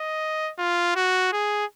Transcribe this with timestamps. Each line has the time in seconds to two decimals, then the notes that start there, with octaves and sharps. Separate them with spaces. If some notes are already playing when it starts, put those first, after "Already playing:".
Already playing: D#5
0.59 F4
0.96 F#4
1.33 G#4